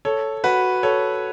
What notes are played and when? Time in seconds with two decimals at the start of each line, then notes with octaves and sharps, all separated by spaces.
0.05 A4 C#5
0.44 F#4 B4
0.83 A4 C#5